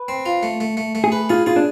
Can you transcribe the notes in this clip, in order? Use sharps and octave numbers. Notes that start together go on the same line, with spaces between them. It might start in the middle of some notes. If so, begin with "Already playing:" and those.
Already playing: B4
C4
F4
A3
A3
A3
A3
G#4
B4
F4 G#4
F4 G#4
D4